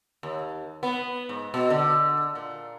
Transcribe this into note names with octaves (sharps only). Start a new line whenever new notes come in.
D#2
B3
G#2
B2
D3
A#2